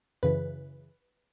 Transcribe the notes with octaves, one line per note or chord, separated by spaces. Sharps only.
F#2 C#3 E3 B4